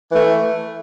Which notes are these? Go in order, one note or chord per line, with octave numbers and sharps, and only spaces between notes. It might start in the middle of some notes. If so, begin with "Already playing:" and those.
E3 A3